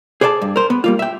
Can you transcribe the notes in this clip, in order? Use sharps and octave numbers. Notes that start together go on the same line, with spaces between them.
G#4 C5 D5 F#5 A5
G2
A#4 C5
B3
G3 A#3 F4
E5 G5